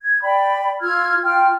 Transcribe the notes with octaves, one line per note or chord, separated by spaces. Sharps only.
G#6
D5 G5 B5
F4 E6 F6 G#6
F4 G5 F6